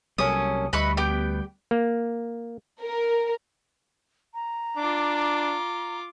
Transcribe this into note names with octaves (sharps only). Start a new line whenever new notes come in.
C2 F#3 G3 A#3 C#4 A4 D#6
D2 G3 B4 D#5 E5 B5 C#6
B3 G4 G5
A#3
A#4
A#5
D4 F4 D6